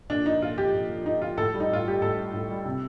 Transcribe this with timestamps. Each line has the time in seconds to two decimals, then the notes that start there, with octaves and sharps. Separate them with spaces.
0.10 A#2 D4
0.26 F3 D#4
0.42 A#2 F4
0.58 F3 G4
0.74 A#2
0.89 F3
1.06 A#2 D#4
1.22 F3 F4
1.37 A2 A4
1.54 G3
1.60 D#4
1.70 A2 F4
1.86 G3 G4
2.02 A2 A4
2.18 G3
2.33 A2
2.49 G3
2.65 C3